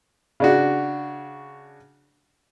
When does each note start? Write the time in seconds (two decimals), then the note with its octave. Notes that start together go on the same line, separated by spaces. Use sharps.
0.40 C#3 D4 F#4